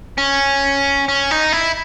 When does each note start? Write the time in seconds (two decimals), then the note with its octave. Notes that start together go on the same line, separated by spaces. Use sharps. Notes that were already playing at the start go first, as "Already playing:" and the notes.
0.18 C#4
1.08 C#4
1.31 D#4
1.53 E4